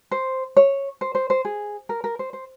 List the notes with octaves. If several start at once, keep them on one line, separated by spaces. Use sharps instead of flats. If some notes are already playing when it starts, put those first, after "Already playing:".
C5
C#5
C5
C5
C5
G#4
A#4
A#4
C5
C5